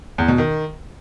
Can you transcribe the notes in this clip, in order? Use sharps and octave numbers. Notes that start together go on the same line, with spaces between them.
E2
B2
D#3